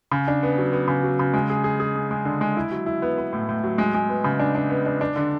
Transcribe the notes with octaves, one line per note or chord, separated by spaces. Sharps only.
C#3
D4
B3
F#3
B3
C#3
F#3
C#3
G#3
G#4
G#4
G#4
G#3
G#3
D3
G#3
E4
F#3
E4
B3
B3
A2
A2
F#3
G#3
G#3
B3
C#3
D4
D4
B3
D4
D4
D3